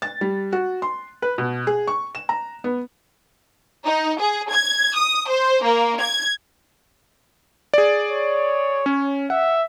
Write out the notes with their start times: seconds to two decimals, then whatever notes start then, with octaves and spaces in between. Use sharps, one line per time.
0.02 A6
0.21 G3
0.53 F#4
0.82 C6
1.22 B4
1.38 B2
1.67 G#4
1.87 C#6
2.15 E7
2.29 A#5
2.64 B3
3.85 D#4
4.20 G#4
4.51 G#6
4.96 D#6
5.29 C5
5.64 A#3
6.01 G#6
7.74 G#4 D5
8.09 C#5
8.86 C#4
9.30 E5 F#5